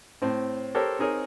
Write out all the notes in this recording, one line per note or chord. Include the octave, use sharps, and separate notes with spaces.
A2 C4
G4 A4 A#4 C5 C#5
C4 D#4 G#4 A#4 C#5